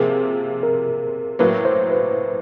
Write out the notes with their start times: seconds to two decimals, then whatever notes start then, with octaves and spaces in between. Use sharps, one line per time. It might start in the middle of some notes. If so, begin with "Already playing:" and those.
Already playing: C3 F3 A#3 G#4
0.63 A#4
1.39 A2 F#3 A#3 B4
1.65 C5
1.91 B4